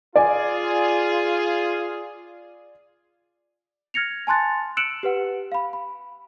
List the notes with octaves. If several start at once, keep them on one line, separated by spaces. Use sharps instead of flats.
F4 G#4 D5 G#5
F6 G#6 A#6 C#7 F7
G#5 A5 C6 F#6 A6
E6 F#6 C#7 D7 E7 F#7
G4 B4 F#5
F5 B5
B5